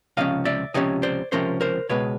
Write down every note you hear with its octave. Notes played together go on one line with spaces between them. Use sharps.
C#2 C3 F3 C#4 D#5 F5
D5 E5
C#2 C3 F3 C#4 C#5 D#5
C5 D5
C#2 C3 F3 C#4 A#4 C5
A#4 C5
C#2 B2 G#3 B4 C#5